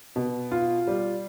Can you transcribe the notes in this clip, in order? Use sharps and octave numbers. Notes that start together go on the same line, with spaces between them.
B2
F4
G3